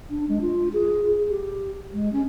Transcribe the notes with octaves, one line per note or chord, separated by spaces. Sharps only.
D4
G#3
F4
G#4
G#4
G4
G#3
C#4